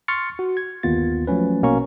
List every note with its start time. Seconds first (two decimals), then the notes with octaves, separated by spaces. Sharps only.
0.08 C6 C#6 F6 A6 C#7
0.39 F#4
0.57 G#6
0.83 G1 D#2 B3 F4 A6
1.27 F3 F#3 A3 C#4 B4
1.62 A#1 B2 A#3 C#4 A#5 C#6